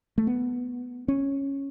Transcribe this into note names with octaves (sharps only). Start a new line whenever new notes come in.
A3
B3
C#4